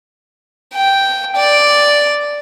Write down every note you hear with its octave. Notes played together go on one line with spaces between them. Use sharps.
G5
D5